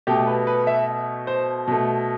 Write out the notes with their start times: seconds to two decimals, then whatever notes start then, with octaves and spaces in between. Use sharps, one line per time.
0.07 B2 A3 G4
0.27 B4
0.47 B4
0.67 E5
1.27 C5
1.68 B2 A3